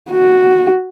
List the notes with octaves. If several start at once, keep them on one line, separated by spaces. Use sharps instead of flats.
F#4